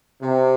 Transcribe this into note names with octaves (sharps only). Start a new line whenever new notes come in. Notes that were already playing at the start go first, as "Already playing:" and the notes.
C3